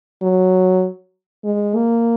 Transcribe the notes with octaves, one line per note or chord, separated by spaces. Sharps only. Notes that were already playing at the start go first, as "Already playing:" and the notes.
F#3
G#3
A#3